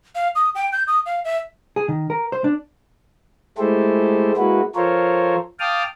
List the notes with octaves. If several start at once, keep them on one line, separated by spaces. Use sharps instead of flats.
F5
D#6
G5
G6
D#6
F5
E5
G#4
D#3
A#4
C5
D4
G#3 A3 E4 G4 A4 C5
G#3 A#3 E4 F#4 B4
F3 F4 A4 A#4 C5 C#5
F5 G5 A5 D6 D#6 F6